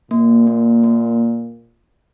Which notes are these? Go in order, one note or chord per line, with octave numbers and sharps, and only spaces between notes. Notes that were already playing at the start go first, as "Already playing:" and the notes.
A#2 A#3
A#3
A#3